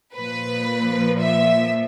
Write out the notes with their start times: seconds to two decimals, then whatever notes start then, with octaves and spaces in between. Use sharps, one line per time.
0.15 A#2 F3 B4
1.22 E5